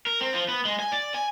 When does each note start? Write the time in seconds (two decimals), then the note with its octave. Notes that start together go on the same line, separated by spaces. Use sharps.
0.07 A#4
0.21 C4
0.34 F3
0.49 B3
0.65 G#3
0.80 G#5
0.92 D5
1.14 G#5